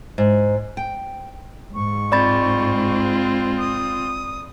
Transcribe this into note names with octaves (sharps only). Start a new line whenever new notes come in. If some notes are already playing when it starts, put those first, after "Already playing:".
G#2
G5
G#2 C#6
C4 F4 D5 B5 A6
D#6